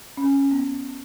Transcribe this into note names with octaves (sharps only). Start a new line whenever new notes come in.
C#4
B3